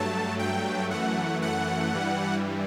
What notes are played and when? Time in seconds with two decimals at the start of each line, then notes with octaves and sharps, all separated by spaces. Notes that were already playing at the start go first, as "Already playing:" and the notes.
Already playing: G2 F#3 A3 A5
0.39 G5
0.90 F#2 E3 A3 F#5
1.42 F#5
1.94 G2 E3 G3